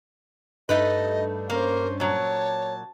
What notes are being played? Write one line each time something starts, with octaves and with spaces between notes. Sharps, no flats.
G2 A3 D#4 B4 D#5
A#3 C#4 A#4 C5
A#2 F#3 C#5 A5